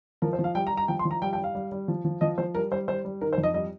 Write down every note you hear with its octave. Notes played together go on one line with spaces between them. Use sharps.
F3 A#4
C5
F3
F5
G3 G5
A#5
G3
A#5
F3 G5
C6
F3
A#5
G3 G5
G5
G3
F5
G3
G3
F3
F3
F3 D#5
F3 C5
G3 A#4
G3 C5
G3 C5
G3
D#3 A#4
C5
F2
D#5
G3 D#5